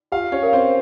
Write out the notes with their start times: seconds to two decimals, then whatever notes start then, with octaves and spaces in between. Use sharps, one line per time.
0.12 F4 G4 F5
0.32 C#4 C#5
0.43 A#4 F5
0.53 C4 C5